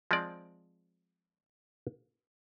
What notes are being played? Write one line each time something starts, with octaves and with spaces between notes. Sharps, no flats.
F3 G#3 C4 D5